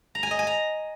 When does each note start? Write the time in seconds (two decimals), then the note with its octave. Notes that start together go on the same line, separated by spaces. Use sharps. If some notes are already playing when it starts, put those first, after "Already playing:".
0.15 A#5
0.23 G#5
0.31 D#5
0.39 G#5
0.47 A#5